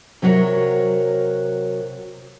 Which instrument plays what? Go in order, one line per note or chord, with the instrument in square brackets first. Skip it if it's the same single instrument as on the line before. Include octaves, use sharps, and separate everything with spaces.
[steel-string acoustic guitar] C3 F#3 E4 F#4 A#4 C#5